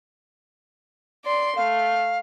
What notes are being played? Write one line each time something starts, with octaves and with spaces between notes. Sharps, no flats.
D5 C6
A3 F5